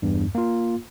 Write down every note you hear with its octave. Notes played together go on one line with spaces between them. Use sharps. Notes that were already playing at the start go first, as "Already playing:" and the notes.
E2 G2
A#3 F4